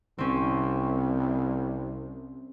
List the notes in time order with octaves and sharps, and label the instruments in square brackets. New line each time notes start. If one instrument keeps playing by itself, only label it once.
[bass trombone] C2 [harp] C4 C#4